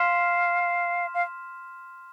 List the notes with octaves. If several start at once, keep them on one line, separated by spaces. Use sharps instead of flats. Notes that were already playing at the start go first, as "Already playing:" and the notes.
Already playing: F5 C6 F6 B6 E7
F5